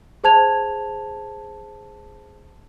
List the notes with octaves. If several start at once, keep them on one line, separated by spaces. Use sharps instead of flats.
G#4 C5 A5 G#6 F7